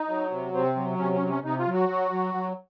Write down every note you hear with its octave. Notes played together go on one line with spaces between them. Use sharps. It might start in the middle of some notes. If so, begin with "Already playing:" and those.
Already playing: D#4
F#3
C3
C3 C4
F#3
C3 C#4
C#4
C3
C#4
C3 D#4
F4
F#3
F#4
F#3
F#3
F#3